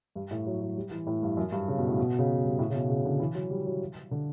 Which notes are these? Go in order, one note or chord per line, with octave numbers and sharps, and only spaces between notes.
G2
A2
F#3
F#3
G3
E3
A2
G2
F#2
G2
C#3
B2
A2
B2
C#3
B2
G2
A2
C#3
B2
C#3
D3
E3
F#3
G3
F#3
D3